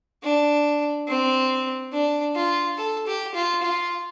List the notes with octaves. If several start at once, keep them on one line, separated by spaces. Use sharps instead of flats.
D4
C4
D4
F4
A4
G4
F4
F4